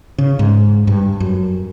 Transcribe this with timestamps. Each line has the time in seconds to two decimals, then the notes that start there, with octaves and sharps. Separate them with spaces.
0.18 C#3
0.39 G#2
0.87 G2
1.20 F#2